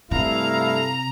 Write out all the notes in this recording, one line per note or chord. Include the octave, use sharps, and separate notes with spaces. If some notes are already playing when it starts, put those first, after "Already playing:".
G2 C3 A3 E4 A4 F5 A#5